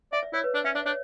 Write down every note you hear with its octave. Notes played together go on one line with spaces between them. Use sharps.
D5 E5
D5
E4 C#5
B4
D4 D5
C#4 E5
D4 D5
D4 C#5